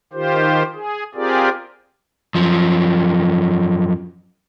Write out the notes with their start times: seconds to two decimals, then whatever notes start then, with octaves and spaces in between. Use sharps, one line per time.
0.13 D#3 F4 G4 C5
0.74 G#4
1.15 C4 F4 G4 G#4 A#4 D5
2.35 F#2 F3